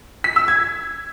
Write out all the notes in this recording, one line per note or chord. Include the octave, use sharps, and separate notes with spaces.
B6
E6
G#6